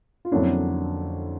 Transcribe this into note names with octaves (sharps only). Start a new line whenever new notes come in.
F4
F2 D3 F#3 A#3 C#4 D4 E4